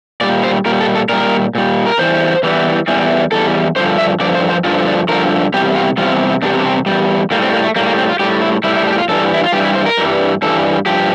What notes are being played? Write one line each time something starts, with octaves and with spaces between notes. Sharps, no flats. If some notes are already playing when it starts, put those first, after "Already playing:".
A#2 G3 D5
C5
A#2 G3 A#4
A4
A4
A#2 G3 A#4
A#2 G3
A#4
E2 E3 G3 C5
E2 E3 G3
E2 E3 G3
E2 E3 G3 A4
G2 D3 F3 C5
E5
G2 D3 F3 D5
C5
C5
G2 D3 F3 F4
D4
G2 D3 F3 A#4
E2 C3 G3 G4
F4
E2 C3 G3 F4
E2 C3 G3 D4
D4
C4
E2 C3 G3
A2 G3 A#3
C4
A#3
A3
A2 G3 A#3
A#3
C4
F4
A2 G3 G4
E4
A2 G3 E4
E4
D4
G4
F4
G2 E3 G3 A4
E4
F4
G2 E3 G3 G4
E4
C5
A#4
G2 E3 G3
G2 E3 G3 A4
G2 F3 G4